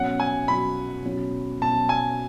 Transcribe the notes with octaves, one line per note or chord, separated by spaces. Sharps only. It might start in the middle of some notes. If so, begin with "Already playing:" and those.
Already playing: B2 F#3 C#4 F#5
G#5
B2 F#3 C#4 B5
B2 F#3 C#4
B2 F#3 C#4 A5
G#5